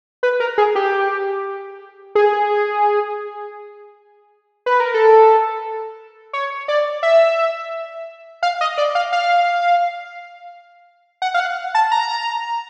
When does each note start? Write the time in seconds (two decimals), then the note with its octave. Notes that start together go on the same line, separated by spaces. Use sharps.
0.23 B4
0.40 A#4
0.58 G#4
0.75 G4
2.15 G#4
4.66 B4
4.80 A#4
4.94 A4
6.33 C#5
6.68 D5
7.03 E5
8.43 F5
8.61 D#5
8.78 D5
8.95 F5
9.12 F5
11.22 F#5
11.34 F5
11.40 F#5
11.75 A5
11.92 A#5